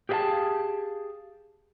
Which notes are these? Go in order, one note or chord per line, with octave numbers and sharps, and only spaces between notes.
G4 G#4 B4 E5 F5 A5